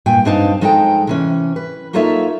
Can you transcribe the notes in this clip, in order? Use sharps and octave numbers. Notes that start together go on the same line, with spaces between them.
G2 A#2 G5 G#5
G2 C4 D4 D#4 F5 A5
F3 G#3 D#4 A4 E5 G5
C3 E3 C#4
B4
A#3 D#4 F4 A4 C#5 E5